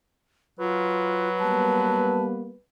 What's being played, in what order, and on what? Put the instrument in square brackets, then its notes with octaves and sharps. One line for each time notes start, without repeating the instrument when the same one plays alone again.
[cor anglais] F#3 [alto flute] F4 [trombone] B4
[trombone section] G3 A#3 B3 [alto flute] A5